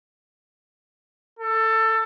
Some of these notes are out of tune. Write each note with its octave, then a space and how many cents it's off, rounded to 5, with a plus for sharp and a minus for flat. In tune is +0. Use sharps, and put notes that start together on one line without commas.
A4 +20